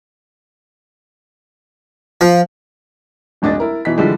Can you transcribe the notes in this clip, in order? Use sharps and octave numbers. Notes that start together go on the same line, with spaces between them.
F3
D#1 G#1 D4 D#5 A6
E4 A#4
B2 E3 D#4 B6
D3 E3 F3 G3 G#3